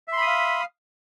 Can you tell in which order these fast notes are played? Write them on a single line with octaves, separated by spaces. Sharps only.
E5 C6 B5 D#6 F5